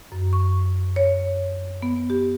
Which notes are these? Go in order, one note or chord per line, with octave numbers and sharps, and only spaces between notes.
F#2
C#6
C#5
B3
G4